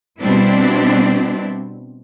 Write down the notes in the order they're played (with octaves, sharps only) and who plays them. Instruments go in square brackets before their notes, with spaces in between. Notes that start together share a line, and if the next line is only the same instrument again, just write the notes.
[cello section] B2 G3 C4 D4 E4